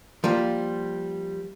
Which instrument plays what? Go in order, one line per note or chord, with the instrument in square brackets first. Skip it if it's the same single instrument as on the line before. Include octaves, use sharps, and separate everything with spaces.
[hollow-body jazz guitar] F3 G3 A#3